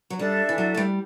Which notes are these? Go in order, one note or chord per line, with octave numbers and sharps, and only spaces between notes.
F#3
G3 D4 A4 E5
E3
F#3
A3
G3